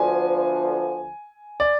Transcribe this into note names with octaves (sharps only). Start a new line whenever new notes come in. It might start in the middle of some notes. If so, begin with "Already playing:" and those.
Already playing: D2 D3 F3 B3 G#5
D5